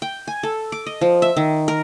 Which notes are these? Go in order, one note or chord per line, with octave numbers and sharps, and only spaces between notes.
G5
G#5
A4
D6
D#5
F3
E5
D#3
A#4